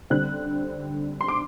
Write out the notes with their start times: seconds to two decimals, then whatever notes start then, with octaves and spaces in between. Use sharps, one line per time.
0.10 D3 G3 C4 F#6
1.21 C6
1.28 D6